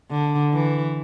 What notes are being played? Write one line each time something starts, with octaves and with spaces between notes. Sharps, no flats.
D3
E3